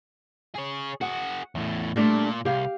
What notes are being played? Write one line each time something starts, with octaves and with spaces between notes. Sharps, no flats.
G#4 C#5
F#4 G#4 F#5
E2 A2
A#2 G3 A3 D4 F4
C2 G4 F5